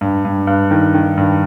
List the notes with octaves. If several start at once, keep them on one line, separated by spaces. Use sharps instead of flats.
G2
G2
G2
D#3
D#3
G2